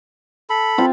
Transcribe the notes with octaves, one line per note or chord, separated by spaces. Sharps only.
A4 B5
C4 F4